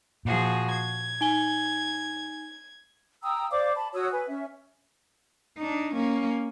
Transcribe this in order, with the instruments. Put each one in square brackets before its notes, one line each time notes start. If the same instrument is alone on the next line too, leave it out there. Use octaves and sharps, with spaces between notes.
[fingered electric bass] A#2 [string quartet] F3 F#4 G#4
[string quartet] G#6
[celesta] D#4 G#5 G7
[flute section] G5 A#5 D#6 E6
C5 D5 F5 D6
A5 B5
F#4 C#5 D#6 E6
B4 G#5
C#4 E5
[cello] D4 D#4
A#3 C#4